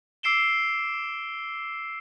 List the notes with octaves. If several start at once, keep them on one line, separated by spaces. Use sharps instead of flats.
D6 E6 C7 D7 E7 G7